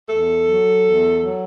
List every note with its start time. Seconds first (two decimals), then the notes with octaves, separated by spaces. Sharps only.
0.10 E2 A4
0.48 F#3
0.85 E2
1.23 F#3